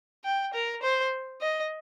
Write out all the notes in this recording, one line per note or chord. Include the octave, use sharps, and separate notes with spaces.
G5
A#4
C5
D#5